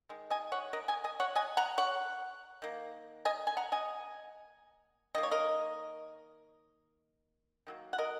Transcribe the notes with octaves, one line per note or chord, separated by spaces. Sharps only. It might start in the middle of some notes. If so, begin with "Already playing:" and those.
D#3 G#3
D#5 G#5
C#5 F#5
A#4 D#5
D#5 G#5
D#5 G#5
C#5 F#5
D#5 G#5
F#5 A#5
C#5 F#5
D#3 A#3
D#5 G#5
G#5
F#5 A#5
D#5 G#5
D#3 A#3 D#5
C#5
A#4 D#5
D#3 F#3 A#3
F#5
A#4 D#5